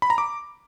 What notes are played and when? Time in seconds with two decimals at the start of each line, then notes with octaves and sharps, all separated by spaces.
0.02 B5
0.10 A#5
0.18 D6